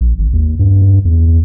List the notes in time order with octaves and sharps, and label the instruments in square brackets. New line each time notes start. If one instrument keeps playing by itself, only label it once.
[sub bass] A#1
G#1
D#2
G2
G2
E2